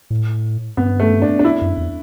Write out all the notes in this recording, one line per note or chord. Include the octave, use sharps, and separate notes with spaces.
A2
G2 B3
A3
D4
D4
E4
F#2
E2